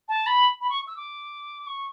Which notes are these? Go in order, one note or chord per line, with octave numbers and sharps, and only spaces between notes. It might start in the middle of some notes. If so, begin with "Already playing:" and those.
A5
B5
B5
C#6
E6
D6
C#6